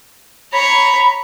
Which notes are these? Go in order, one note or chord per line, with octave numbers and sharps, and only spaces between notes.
C#5 A#5 B5